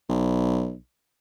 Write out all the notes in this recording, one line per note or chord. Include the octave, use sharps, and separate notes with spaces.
B1